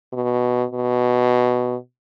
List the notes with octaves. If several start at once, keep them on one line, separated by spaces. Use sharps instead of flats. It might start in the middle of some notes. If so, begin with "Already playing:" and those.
B2
B2